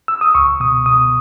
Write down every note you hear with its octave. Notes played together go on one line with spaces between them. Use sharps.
E6
D#6
C#2 C#6
B2 D#6
B2 D#6